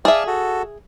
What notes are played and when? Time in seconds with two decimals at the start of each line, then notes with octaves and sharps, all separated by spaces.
0.05 G#4 D5 E5 F5 A5
0.27 F#4 A4